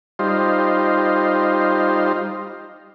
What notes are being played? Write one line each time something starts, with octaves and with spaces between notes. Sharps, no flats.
G3 D#4 F4 C5